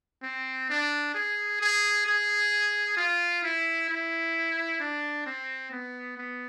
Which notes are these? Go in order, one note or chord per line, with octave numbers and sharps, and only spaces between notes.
C4
D4
G#4
G#4
G#4
F4
E4
E4
D4
C4
B3
B3